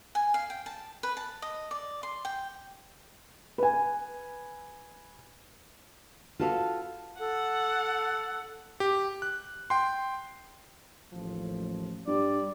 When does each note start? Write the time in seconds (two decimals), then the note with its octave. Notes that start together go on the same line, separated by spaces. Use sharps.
0.15 G#5
0.34 F5
0.50 G5
0.66 A5
1.03 B4
1.17 A5
1.42 D#5
1.71 D5
2.03 C6
2.25 G5
3.58 B4 G#5
6.40 F4 F#4 A4 B4 D5 F5
7.19 A4 F#5
8.80 G4
9.22 F#6
9.70 G5 C6
11.13 A1 D#2 F3
12.07 G2 G3 D5